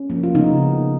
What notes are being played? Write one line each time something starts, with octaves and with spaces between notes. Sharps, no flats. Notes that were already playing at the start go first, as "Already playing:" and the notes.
Already playing: C#4
F3 A#3
F4
C#3 B3 D#4